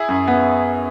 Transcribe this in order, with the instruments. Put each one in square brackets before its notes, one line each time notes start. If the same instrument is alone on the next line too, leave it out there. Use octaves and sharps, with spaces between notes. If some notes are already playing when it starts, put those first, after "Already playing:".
Already playing: [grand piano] E4 G#4
F#2
B3